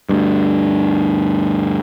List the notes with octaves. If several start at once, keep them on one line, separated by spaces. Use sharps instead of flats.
D2 G2